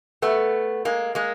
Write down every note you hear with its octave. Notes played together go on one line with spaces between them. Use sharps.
A3 B3
G#3 A#3
G#3 A#3